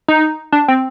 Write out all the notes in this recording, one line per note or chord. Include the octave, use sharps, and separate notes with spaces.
D#4
D4
C4